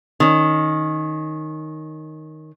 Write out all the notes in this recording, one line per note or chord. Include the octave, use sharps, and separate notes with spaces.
D#3 C#4